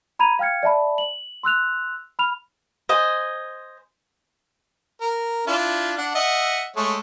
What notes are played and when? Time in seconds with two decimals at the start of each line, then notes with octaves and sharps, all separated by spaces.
0.19 A#5 B5 G#6 D#7 F7
0.39 F5 G5 F6 G#6 C#7
0.63 D5 E5 A5 B5
0.98 F#7
1.43 C6 E6 F#6 F7
2.19 B5 F6 F7
2.89 C5 D#5 G#5
5.02 A#4
5.47 D4 E4 F4
5.98 D4 F#5
6.15 D#5 E5 F#5
6.76 G#3 A3 C#5